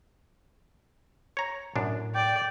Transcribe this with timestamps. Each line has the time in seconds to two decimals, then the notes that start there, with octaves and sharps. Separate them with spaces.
1.37 C#5 A#5
1.76 F#2 A2 D4
2.14 D5 G5